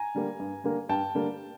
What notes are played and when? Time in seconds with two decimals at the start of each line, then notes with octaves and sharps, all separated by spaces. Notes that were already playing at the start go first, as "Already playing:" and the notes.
Already playing: G#5 A#5
0.15 D3 G3 A#3
0.40 G2
0.64 D3 G3 A#3
0.89 G2 G5 A5
1.15 D3 G3 A#3